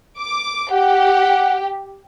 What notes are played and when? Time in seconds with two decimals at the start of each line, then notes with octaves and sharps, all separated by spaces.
0.20 D6
0.71 G4 F#5